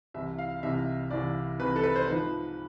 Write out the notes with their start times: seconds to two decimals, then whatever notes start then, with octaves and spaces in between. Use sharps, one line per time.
0.14 C2 C3 E3 E5
0.39 F5
0.63 C2 C3 E3 E5
1.10 C2 C3 E3 D5
1.60 C2 C3 E3 B4
1.76 A4
1.84 B4
1.96 C5
2.08 G#2 F3 B4